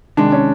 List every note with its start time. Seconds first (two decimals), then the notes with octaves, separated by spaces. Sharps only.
0.17 C3 D#3 G#3 D4
0.32 C#4